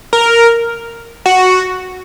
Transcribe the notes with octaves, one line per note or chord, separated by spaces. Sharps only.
A#4
F#4